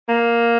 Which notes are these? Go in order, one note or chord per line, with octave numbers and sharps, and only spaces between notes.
A#3